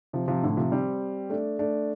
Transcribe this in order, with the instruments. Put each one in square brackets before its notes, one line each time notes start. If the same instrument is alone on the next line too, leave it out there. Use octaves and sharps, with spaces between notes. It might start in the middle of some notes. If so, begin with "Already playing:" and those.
[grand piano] C3 F3
C3 F3
A2 D3
C3 F3
G3 C4
A3 D4
A3 D4